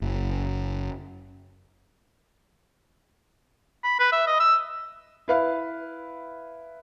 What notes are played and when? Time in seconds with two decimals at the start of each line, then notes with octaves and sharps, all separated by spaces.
0.02 F#1
3.84 B5
3.99 B4
4.12 E5
4.27 D#5
4.40 E6
5.28 E4 B4 F5